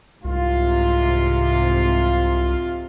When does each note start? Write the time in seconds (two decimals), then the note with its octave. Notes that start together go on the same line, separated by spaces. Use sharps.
0.24 C2 G#2 C3 F4